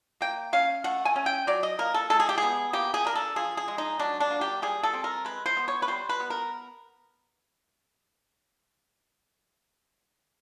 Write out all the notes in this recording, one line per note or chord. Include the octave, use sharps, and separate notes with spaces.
A#3 G5
C#4 F5
A3 F#5
G#5
C#4
G5
F#3 D5
D#5
A#3 A#4
A4
G#3 A4
G#4
G4
B3 G#4
A#3 G4
G#4
D4 A#4
A4
F3 G#4
G#4
G#3
D#4
F#3 D4
D4
A#3
G4
G3 G#4
A4
C4
A#4
G#3 B4
C5
B3
C#5
B4
G3 C5
B4
B3
A#4